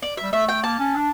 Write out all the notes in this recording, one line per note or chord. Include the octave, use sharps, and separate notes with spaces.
D5
E5
G3
A3 E5
G5
A#3 A5
C#4
D4